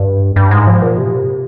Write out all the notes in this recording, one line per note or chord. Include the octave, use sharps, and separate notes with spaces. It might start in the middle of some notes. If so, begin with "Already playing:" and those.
Already playing: G2
G2
G#2
F3
A#2
C3